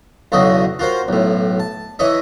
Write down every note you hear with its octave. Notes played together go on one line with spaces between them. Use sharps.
B1 E2 C#3 A3 F#4 D#5
F4 F#4 A#4 C5
B1 A2
A5
E3 E4 C#5 D#5 E5